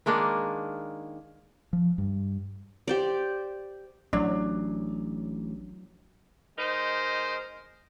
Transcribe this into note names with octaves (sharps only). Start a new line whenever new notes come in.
D#3 G#3 A#3 D4
F3
G2
G4 C5 D5
A1 F#3 D4
G#3 D#4 A#4 C5